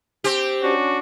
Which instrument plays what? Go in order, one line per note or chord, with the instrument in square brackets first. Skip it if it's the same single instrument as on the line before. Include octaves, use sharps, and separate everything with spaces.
[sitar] C4 G4
[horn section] C#4 D4 F#4